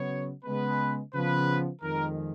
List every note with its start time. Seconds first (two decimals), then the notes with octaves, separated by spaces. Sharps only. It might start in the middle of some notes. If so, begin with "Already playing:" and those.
Already playing: C#3 F#3 B3 C#5
0.45 C#3 G#3 B3 B4
1.14 C#3 F3 B3 B4
1.82 F2 D#3 G#3 A#4